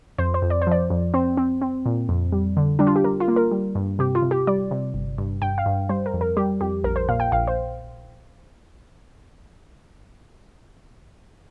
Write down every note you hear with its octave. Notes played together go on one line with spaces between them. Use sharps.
F2 C5
C5
F2
D5
C5
F3 D5
F2
C4 C5
C4
C4
A#2
F2
G3
D3
G3 D4
F4
G4
G3 A#4
F4
A#3
A#4
G3
G2
C3 G4
F4
C3
G4
G3 D5
C3
G1
G2
G2 G5
F5
G2
G3 C5
A#4
F2
A#4
G3 G4
F2 G4
A#1 A#4
C5
A#2 F5
G5
A#1 F5
C5